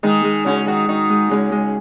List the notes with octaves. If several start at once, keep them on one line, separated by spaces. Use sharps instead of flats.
D#3 G#3 D#4
G#3
C#3 C#4 F#4
D#3 D#4 F#4
D#3 D#4 F#4
G#3
C#3 G#3 C#4
G#3